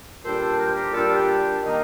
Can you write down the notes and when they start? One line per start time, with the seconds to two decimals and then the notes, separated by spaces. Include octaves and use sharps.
0.23 A#2 G3 D4 A4 C5
0.59 A#4
0.66 C5
0.73 G4 A#4
0.92 A#2 G3 D4 F4 A4
1.09 F4
1.16 G4
1.63 D#3 A#3 D#4